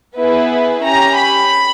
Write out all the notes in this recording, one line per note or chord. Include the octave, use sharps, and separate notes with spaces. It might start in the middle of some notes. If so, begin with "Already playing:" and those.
B3 E4 G#4 B4
C#4 G4 A#5
B5